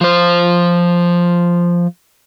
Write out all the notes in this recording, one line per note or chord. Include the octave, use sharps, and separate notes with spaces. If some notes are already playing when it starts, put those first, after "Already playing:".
F3 C5